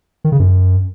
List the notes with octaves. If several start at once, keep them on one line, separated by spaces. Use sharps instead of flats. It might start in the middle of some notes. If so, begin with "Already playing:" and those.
D#3
C#3
F#2